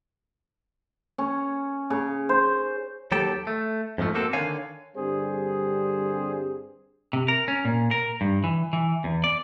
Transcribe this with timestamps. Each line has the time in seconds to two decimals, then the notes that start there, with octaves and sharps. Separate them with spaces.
1.18 C#4
1.90 C#3
2.29 C5
3.12 D#2 F#3 G4 A4 G5 A5
3.47 A3
3.98 F2 G#2 F3 A3
4.15 A#3 C4 F#4 A4
4.33 D3 D#3 C#5 F5 G#5
4.96 G2 D3 G3 C4 G#4 C5
7.13 C3
7.28 A#4
7.48 C#4
7.65 A#2
7.91 A#4
8.21 G2
8.44 E3
8.73 E3
9.04 E2
9.24 D5